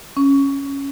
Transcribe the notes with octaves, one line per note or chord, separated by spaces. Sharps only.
C#4